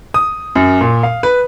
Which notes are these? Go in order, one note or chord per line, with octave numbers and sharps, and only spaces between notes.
D#6
F#2
A#2
F5
B4